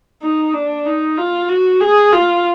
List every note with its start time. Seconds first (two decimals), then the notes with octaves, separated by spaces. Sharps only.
0.22 D#4
0.53 D4
0.86 D#4
1.17 F4
1.49 F#4
1.81 G#4
2.13 F4